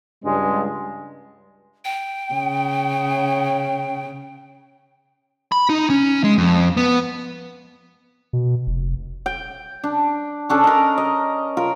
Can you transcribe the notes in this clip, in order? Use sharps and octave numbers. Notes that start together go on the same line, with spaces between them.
C#2 G2 G#3
G5
C#3
B5
D#4
C#4
G#3
F2
B3
B2
F1
G5
D4
C#4 D4 A4
A#4 D#5
D#5
F4 A#4